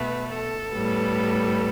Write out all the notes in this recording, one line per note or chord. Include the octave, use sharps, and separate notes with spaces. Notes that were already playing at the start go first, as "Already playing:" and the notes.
Already playing: B2 A3 B4
A4
A2 G3 B3